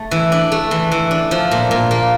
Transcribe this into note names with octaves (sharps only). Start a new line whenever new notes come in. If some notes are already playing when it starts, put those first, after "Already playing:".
Already playing: A3
E3
D4
A3
E3
E3
D4
F3
A#2
A#2
A#3